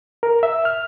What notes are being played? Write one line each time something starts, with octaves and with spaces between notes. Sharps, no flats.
A#4
E5
F6